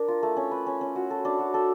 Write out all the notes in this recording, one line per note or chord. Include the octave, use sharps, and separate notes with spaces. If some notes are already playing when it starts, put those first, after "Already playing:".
Already playing: D4 A#4
F4
A3
C#4
B4
C#4
C#4
F#4
A4
D4
F#4
A4